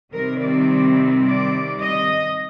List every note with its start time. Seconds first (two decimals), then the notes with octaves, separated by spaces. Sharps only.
0.13 C3 D#3 G3 C4 A#4
0.42 D5
1.26 D5
1.82 D#5